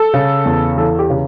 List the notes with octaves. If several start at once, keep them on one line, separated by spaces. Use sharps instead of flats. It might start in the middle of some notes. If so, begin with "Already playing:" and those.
Already playing: A4
C#3
E2
E3 A4
G4
C#3